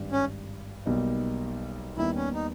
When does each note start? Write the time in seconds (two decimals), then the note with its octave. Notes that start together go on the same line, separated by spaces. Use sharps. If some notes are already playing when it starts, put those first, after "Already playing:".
Already playing: G#1 G2 G3
0.12 C#4
0.86 B1 B2 G3 A#3 D#4
1.97 D#2 D#3 G3 B3 E4
2.16 C#4
2.34 D#4